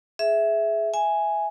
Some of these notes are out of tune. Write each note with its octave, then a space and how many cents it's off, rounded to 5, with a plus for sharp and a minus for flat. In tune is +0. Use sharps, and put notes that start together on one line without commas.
G#4 +15 E5 +0
E5 +0 G#5 +0